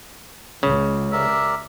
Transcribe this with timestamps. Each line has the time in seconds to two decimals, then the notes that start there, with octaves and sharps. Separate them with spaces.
0.63 C#2 C#3
1.12 G4 A#4 D5 E5